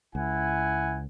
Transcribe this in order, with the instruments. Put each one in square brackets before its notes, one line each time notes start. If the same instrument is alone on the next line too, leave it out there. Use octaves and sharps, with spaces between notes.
[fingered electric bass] C#2 [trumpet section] E4 F#5 G#5